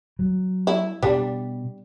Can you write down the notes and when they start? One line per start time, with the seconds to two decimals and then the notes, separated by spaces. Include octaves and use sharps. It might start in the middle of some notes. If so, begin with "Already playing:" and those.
0.19 F#3
0.67 E4
1.03 B2 G3 D4